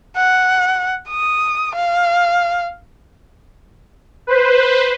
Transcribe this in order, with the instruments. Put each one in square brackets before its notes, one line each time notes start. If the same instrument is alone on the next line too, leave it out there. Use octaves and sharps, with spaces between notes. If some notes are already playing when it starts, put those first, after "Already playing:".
[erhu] F#5
D#6
F5
[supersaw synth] B4 C5